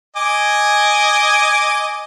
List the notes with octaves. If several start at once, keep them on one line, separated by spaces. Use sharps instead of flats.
D#5 G#5 D6